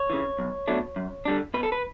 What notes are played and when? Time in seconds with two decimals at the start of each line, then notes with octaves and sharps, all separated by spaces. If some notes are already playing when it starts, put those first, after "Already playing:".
Already playing: C#5
0.10 C#3 E3
0.39 B1
0.68 B2 F#3 A3 D4
0.96 F#2
1.25 D3 G3 D4
1.54 B2 B4
1.63 A4
1.72 B4